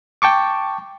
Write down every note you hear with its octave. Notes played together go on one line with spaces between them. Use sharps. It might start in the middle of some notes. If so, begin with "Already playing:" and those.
G5 A5 C#6 D6